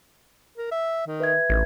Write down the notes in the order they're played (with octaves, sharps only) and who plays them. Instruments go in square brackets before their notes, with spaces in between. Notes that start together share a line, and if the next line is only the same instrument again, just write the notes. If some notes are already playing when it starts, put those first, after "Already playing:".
[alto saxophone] A#4
E5
D#3
[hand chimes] B4 E5 G#6
[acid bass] A1 [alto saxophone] D#3